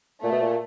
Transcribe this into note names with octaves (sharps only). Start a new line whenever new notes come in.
A#2 A3
B2
A#2